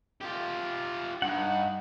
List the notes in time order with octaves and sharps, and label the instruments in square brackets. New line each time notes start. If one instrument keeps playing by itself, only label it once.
[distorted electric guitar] F4 G4
[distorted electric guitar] G2 [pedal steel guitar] D#4 F#5